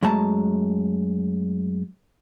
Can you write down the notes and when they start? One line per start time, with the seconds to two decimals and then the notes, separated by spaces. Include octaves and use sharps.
0.03 F#2 G#3 A3 A5 A#5